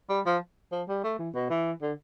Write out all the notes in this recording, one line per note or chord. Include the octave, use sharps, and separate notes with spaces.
G3
F3
F3
G3
A3
E3
B2
E3
D3